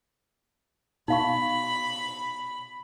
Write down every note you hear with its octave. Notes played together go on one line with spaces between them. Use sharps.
B2 D#4 F5 B5 C#6